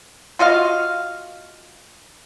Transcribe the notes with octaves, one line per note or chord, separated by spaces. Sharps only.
F4 F#4 D#5 F5